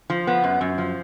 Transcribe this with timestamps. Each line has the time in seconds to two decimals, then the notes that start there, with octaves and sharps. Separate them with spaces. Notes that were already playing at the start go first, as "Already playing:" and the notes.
0.10 F3
0.27 B3
0.44 F#2
0.61 F#2
0.78 F3